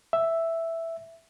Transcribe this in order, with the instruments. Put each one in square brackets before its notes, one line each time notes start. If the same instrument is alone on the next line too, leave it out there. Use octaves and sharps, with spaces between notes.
[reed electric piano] E5